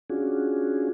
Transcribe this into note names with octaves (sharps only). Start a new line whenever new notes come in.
C#4 D4 F4 F#4 G#4